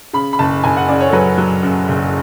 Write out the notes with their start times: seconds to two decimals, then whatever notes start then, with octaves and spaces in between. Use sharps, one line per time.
0.13 C#3 B5
0.33 B5
0.39 F#1 A5
0.64 F#1 G#5
0.77 F#5
0.88 C#3 D5
1.00 C#5
1.08 A4
1.13 F#3 B4
1.38 F#3
1.63 F#2
1.88 F#1